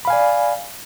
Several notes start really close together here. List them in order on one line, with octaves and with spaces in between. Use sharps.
B5 F5 G#5 D5